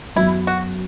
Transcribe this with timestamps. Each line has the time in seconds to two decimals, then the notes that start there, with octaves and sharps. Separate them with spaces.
0.16 F#2 F#3 B3 E4
0.47 F#4